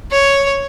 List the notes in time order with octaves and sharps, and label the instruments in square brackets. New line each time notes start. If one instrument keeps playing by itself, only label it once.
[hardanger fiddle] C#5